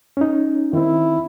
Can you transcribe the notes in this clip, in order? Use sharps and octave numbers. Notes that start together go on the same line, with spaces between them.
C#4 D#4
D#3 C4 E4